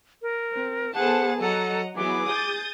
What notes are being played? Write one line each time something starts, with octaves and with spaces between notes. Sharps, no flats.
A#4
C4
B3 G#4 A4 C5 F#5 A5
F#3 A4 D#5 F#5 A#5
E3 F#3 B3 G#4 D6
D#6 G6 A6